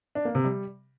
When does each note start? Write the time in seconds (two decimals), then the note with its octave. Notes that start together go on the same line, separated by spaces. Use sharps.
0.15 D4
0.25 A#3
0.35 C3
0.45 G3